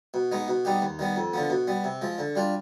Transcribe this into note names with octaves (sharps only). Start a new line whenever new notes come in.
B2
G#3 B3 D#4
B2
G3 B3 D#4 G4
D#2
D#3 G3 B3
F2
D3 F3 B3
B2
G3 B3
C3
F3 G#3
D3
G3 D4 F4